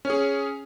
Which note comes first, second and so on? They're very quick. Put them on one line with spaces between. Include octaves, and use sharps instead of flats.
C#4 C#5 G#4